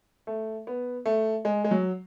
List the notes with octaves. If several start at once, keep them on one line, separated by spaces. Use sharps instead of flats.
A3
B3
A3
G#3
G#3
F#3